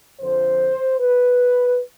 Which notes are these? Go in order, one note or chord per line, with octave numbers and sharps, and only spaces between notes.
F2 D3 F3 C5
B4